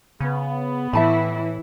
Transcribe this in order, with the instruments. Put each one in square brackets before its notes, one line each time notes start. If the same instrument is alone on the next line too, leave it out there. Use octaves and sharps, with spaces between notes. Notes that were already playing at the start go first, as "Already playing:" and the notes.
[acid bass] C#3 [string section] B3
[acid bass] A2 [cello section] E3 E4 [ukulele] E5 A5 B5